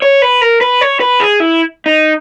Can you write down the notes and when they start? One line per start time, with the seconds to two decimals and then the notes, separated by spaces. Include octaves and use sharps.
0.02 C#5
0.22 B4
0.41 A#4
0.61 B4
0.81 C#5
1.00 B4
1.20 G#4
1.40 E4
1.86 D#4